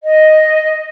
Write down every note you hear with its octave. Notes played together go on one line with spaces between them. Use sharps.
D#5